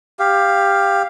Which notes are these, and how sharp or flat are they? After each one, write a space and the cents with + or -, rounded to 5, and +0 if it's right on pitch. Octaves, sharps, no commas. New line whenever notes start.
G4 +15 F5 +0